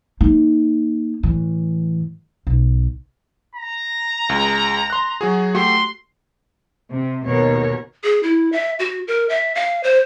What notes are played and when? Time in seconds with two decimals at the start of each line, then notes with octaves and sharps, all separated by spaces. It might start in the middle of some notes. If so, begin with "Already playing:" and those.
0.21 A#3 D#4
1.23 A2 E3
2.47 B1
3.55 A#5
4.29 C#2 G#3
4.90 C6 F#6
5.21 F#3 F#4 G#4
5.55 A3 F#4 G4 C6
6.91 C3
7.27 D#2 B2 A#4 C#5
8.04 G#4
8.23 E4
8.52 E5
8.79 F#4
9.08 A#4
9.29 E5
9.55 F5
9.84 C5